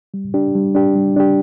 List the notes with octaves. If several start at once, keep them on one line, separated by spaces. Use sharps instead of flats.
G3
D4 G4
G3
D4 G4
G3
D4 G4